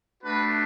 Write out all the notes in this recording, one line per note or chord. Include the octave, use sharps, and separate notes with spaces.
A3 D4 F#4 B4